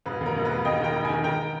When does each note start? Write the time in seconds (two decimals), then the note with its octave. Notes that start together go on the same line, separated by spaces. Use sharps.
0.06 E1 B4
0.21 D#2
0.26 A#4
0.36 E1
0.45 B4
0.50 E1
0.65 D#2 D#5 G5
0.80 D#3 G5 A#5
0.94 E1
1.04 D#3 G#5 B5
1.24 D#3 G5 A#5